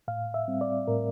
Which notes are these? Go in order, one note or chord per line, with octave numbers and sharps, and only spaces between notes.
A2 F5
E5
G3 C4
D5
A2 A#4